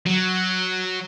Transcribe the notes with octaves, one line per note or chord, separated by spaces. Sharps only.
F#3